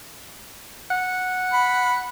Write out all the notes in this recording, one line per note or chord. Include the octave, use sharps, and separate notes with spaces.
F#5
B5